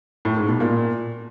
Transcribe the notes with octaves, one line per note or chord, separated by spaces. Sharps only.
A2
G#2
B2
A#2